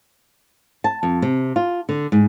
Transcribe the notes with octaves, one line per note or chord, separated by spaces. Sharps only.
A5
F2
C3
F4
D3
G#2